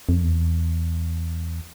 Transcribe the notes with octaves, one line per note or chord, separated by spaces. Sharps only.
F2
E2